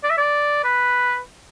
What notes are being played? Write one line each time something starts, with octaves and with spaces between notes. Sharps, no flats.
D5
E5
D5
B4